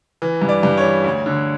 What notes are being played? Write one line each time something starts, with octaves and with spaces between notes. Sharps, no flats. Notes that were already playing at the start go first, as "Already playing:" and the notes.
E3
G2
D5
G2
C#5
E3
D2
D3